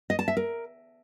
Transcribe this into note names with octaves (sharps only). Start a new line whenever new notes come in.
D#5
A5
E5
A#4